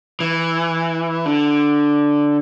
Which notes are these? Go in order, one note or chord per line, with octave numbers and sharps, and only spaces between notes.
E3
D3